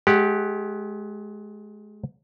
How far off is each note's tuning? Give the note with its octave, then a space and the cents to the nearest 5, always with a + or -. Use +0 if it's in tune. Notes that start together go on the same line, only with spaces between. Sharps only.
G#3 +30 G4 +0 F#5 +0